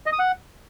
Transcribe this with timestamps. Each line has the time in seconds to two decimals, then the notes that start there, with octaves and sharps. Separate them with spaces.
0.06 D#5
0.13 D#6
0.19 F#5